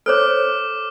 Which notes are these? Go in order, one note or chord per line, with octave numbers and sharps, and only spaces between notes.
A4 C5 C#5 D6 F6